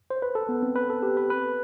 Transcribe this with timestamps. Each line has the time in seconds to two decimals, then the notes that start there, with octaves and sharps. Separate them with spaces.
0.10 C5
0.22 B4
0.35 A4
0.49 B3
0.63 C4
0.76 B4
0.90 A4
1.03 G4
1.17 B4
1.30 B4